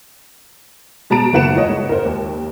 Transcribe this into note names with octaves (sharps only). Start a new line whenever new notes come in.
B2 G#3 A5 A#5 A6 D7
F#1 D#3 B4 F#5 C#7 E7
F4 C#5 D#5
G#2
A#4 C5
D#2